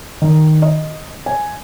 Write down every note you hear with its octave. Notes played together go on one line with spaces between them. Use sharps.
D#3
D#5
G#5